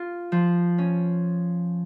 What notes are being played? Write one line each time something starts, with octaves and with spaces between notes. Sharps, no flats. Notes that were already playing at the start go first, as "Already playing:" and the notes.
Already playing: F4
F3
C#4